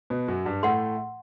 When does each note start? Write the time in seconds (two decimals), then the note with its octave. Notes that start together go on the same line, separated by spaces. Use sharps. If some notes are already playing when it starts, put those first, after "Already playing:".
0.10 B2 B3
0.28 F#2 F#3
0.45 G2 G3
0.63 A2 A3 F#5 C6